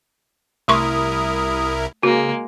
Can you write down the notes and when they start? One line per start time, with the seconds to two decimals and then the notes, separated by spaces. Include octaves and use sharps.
0.68 C2 A3 E4 A#4 C6 C#6 D#6
2.03 C#3 G#3 A#3 F#4